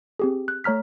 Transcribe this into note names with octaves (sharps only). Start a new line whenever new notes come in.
C4 G4 G#4
F#6
A3 C#5 A#5 F6 B6